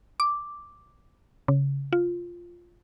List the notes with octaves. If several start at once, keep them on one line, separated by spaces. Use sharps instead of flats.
D6
C#3
F4